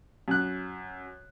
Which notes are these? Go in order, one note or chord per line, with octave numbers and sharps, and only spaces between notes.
F#2 F#6